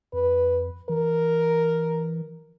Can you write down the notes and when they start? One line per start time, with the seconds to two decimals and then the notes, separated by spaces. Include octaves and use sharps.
0.13 F2 B4
0.89 E3 A#4